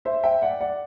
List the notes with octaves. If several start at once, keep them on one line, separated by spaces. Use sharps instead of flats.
C5 E5
E5 G5
D5 F#5
D5 F#5